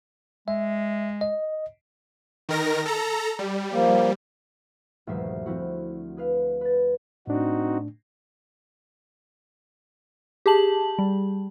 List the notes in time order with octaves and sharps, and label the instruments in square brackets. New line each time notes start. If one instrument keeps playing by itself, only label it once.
[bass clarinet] G#3 [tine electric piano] E5
[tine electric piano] D#5
[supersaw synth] D#3 A#4 A#6
A4 A#5
G3
[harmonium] F3 A#3
[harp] D#1 D2 G2 F3 E5 C7
F3 C4 E4 F#4
G#4 B4 F5
B4 A6
[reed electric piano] A2 A3 D4 [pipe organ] C4 D#4 F#4
[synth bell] G4 G#4 A5 F#7
G3